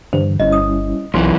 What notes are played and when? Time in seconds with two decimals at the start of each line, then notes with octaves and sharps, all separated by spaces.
0.13 G2 D3 E3 C5
0.40 G1 G3 C#4 E4 D#5
0.52 D#6
1.14 B1 F#2 E3 C6